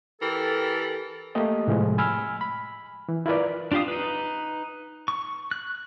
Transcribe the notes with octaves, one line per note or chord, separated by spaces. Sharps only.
E3 G4 A4 A#4
A3 A#3 G4 D#5
A2 C3 F3 G#3
G#5 B5 E6 F6
B5
E3
E4 F4 A#4 B4 D5
D4 F4 G4 F5 D#6
D#4 B4
C#6
F#6